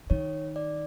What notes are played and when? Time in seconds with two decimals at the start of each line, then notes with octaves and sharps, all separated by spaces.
0.10 D#3 C#5
0.56 D5